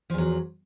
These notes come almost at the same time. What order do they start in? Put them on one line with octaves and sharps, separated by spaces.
F3 E2 F#3